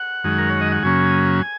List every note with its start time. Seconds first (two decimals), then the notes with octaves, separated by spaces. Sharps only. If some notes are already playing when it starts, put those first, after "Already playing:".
Already playing: F#5
0.24 F#2 D#3 G#3
0.38 A#4
0.49 C#5
0.61 D#5
0.72 F#5
0.83 F#2 C#3 F#3 A#3 C#4 G#5